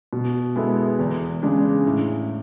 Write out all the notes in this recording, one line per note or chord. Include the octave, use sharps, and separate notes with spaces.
B2
G#3 B3 E4 A4
E2
C#3 G#3 D4
A2